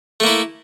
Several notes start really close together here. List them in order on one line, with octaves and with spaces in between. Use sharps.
A3 A#3 E4